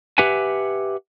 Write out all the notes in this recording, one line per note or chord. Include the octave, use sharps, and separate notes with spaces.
G4 B4 E5 F#5 G#5